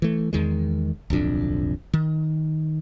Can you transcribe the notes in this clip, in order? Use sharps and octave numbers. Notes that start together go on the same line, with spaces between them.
E3 A3
E2 D#3 G#3
D1 B1 F2 D4
D#3